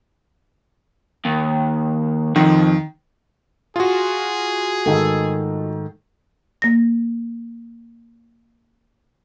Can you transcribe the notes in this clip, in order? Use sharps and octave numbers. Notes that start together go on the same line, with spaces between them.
D#2
F2 D#3
F4 F#4 G#4
G#2 D#3 A4
A#3 A#6